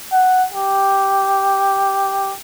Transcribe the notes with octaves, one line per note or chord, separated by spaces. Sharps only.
F#5
G4